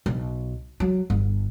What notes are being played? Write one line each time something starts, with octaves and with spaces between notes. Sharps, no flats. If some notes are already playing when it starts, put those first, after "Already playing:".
B1
F#3
G1